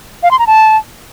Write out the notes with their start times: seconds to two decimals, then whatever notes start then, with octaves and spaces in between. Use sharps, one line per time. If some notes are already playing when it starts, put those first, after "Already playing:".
0.23 F5
0.31 C6
0.39 A#5
0.47 A5